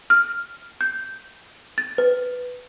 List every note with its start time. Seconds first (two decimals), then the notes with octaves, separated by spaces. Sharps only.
0.10 F6
0.81 G6
1.78 A6
1.98 B4